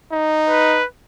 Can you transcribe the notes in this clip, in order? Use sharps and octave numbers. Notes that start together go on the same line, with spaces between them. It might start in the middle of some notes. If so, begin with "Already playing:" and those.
D#4
B4